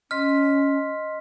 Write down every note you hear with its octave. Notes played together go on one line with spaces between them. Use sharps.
C#4 D#5 C6 F6 B6